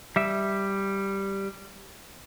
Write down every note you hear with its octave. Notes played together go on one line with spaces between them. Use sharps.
G3 E5